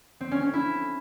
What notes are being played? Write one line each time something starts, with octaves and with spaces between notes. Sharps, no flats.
C4
C#4
C#4
E4